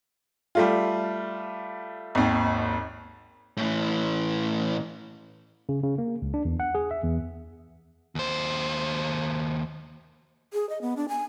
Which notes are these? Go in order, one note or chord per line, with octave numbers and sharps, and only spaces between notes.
G3 A3 F4
G#1 D#2
A2 E3
C#3
C#3
A#3
C#2
D4
E2
F#5
G#4
E5
E2
D#2 C5
G#4
D#5
B3
D4
G#5